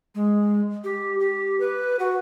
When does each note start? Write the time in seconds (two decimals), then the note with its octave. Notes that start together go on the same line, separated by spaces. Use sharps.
0.15 G#3
0.84 G4
1.20 G4
1.60 B4
1.99 F#4